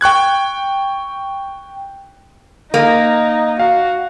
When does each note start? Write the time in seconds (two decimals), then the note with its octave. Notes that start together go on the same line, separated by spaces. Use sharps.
0.01 G5 C#6 F#6 G#6
2.74 A#3 D#4
3.59 F#4 F5